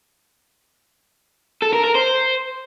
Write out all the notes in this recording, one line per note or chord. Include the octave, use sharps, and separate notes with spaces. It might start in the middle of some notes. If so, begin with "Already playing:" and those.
A4
A#4
A#4
C5